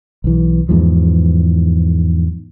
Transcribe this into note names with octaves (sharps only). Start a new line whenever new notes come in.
B1 E3
E2 G#2 F3